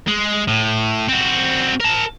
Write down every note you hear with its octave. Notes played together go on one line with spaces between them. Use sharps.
G#3
A2
C4 F#4
A#4 A5